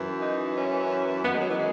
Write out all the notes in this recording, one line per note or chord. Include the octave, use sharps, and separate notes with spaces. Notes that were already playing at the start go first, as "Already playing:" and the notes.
Already playing: F#2 E3
D#4
C#4
F#2 D#3 B3
G#3
F#3
E3
G#3